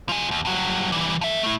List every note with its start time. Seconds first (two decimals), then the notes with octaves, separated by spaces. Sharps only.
0.09 F3 G#4
0.31 D#2
0.45 G2 F#3
0.92 E3 G3
1.21 F3 E5
1.43 A3 E4